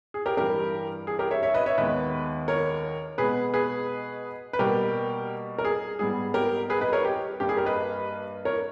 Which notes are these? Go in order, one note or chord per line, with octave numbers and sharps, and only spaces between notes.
G#4
G4 A#4
G2 E3 G3 G4 A#4
G#4
G4 A#4
C#5 E5
C#5 E5
B4 D#5
C#5 E5
D#2 D#3 G#3 B3 B4 D#5
A#4 C#5
B2 G#3 B3 G#4 B4
G#4 B4
B4
B2 G3 A#3 G4 A#4
A#4
G#4
G#2 G3 B3 G#4
G4 A#4
G#4 B4
B4 D#5
A#4 C#5
G4
G2 G3 A#3 G4
G#4
G4 A#4
B4 D#5
A#4 C#5